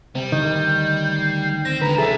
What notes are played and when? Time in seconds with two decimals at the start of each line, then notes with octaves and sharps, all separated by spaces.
0.15 C3 G3
0.32 D2 D#3 D#5 G6
1.16 C7
1.65 C4 A#6
1.81 D3 G#3 B4 A#5
1.98 C2 F3 C#4 G#4 A4 E5